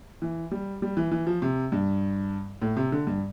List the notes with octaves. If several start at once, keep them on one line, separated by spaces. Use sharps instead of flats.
E3
G3
G3
E3
E3
F3
C3
G2
A2
C3
D3
G2